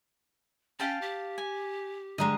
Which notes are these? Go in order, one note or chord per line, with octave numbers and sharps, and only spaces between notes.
C#4 F5 G5 A5
G4
G#5
D3 G3 G#3 D#5 A#5